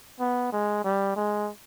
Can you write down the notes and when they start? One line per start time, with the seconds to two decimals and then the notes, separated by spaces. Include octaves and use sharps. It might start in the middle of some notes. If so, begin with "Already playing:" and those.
0.20 B3
0.52 G#3
0.84 G3
1.16 G#3